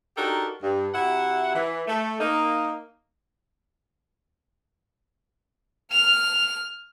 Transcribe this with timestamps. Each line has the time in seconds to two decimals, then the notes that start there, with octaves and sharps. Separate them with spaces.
0.17 D4 D#4 F#4 G4 A4 A#4
0.63 G2
0.94 C3 E4 F#4 E5 F#5
1.55 E3
1.88 A3
2.20 A#3 D#4
5.92 F6 F7